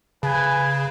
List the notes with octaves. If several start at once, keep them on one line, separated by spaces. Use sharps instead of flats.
C#3 B4 G#5